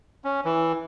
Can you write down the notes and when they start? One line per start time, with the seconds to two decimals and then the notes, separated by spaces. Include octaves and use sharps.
0.24 C#4
0.45 E3